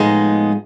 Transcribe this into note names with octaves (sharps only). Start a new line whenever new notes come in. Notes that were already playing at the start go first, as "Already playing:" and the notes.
Already playing: A2 F3 G#3 B3 D#4